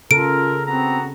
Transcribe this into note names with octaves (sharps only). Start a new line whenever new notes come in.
C#3 F4 A4 A#4 D7
B3 C4 F#4 A#5